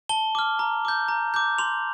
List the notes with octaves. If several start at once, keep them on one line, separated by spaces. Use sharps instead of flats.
A5 G7
D6 F6
A#5
D6 G6
A#5
D6 G6
C6 F7